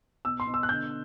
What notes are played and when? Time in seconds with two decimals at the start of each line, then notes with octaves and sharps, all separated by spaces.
0.25 B2 E6
0.40 C6
0.47 B2
0.54 E6
0.63 F#6
0.69 D3 G6